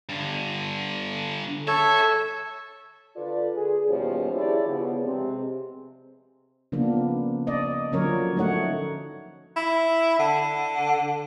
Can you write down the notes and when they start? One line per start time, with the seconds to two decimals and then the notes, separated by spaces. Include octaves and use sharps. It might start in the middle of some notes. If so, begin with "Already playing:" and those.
0.09 G2 D3
1.68 A4 C#5 E5
3.16 D3 F4 A4 B4 D5
3.53 G#4
3.88 D#2 B2 F3 G3 C#4 C5
4.33 D4 E4 G4 G#4 C#5 D5
4.67 C#3 F3 B3
5.04 C3 G#3 C4
6.72 C#3 F3 A#3 B3 D4
7.47 D5 D#5
7.92 D3 F3 F#3 C#4 A#4 C#5
8.37 A3 D#4 C#5 F#5
9.56 E4
10.19 D3